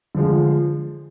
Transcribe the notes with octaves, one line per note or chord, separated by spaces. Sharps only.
D3 F3 G#3